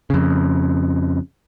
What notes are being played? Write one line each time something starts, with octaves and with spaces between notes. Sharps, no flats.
F2 C#3